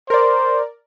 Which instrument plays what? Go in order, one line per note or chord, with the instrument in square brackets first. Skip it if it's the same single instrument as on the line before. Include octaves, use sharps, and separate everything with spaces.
[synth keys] A#4 D5 [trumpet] C5